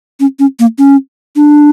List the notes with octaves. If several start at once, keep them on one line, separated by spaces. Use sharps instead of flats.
C#4
C#4
A#3
C#4
D4